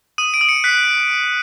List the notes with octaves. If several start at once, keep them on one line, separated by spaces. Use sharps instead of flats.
D#6 D#7
D7
D#6
C#7
F#6 B6